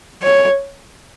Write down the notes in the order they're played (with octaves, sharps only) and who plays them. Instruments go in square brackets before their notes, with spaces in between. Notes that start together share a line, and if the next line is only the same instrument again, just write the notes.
[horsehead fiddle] C#5